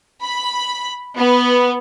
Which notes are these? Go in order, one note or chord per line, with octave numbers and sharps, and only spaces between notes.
B5
B3